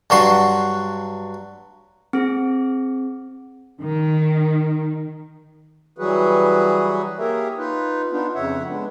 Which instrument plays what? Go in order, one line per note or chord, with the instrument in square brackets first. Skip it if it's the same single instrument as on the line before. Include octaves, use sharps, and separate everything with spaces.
[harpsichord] G2 F#3 F#4 C6
[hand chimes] C4 G#4
[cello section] D#3
[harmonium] E3 F#3 G3 F#4 G#4 B4
A#3 G4 G#4 A#4 C#5 E5
D#4 F4 B4
B3 D4 D#4 F4
F2 C#3 C#5 E5 F#5
G#3 B3 D4